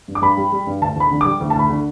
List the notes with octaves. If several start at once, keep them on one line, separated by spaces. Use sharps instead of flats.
G2
D6
G2 B5
G3
G3
G2
D2 A5
D2 B5
D3
G3 D6
D2
A5
D2 B5
D3